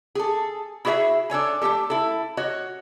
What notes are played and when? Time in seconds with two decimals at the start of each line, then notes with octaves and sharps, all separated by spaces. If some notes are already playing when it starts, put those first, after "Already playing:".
0.15 G#4 A4
0.85 E4 F#4 G#4 C#5 E5
1.30 D4 A4 C#5 G#5
1.62 A3 C4 G4 A4
1.90 E4 A4
2.37 F#4 C#5 D#5